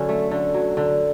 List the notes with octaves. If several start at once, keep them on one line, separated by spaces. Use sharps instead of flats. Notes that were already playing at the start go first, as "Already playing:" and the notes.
Already playing: D3 F#3 C#4
A3
D3
F#3
D3